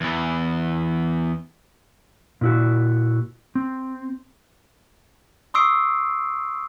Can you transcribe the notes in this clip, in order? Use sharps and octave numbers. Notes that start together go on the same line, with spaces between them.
E2 E3
A#2 E4 F#4
C4
C6 C#6 D#6 E6 C7 D7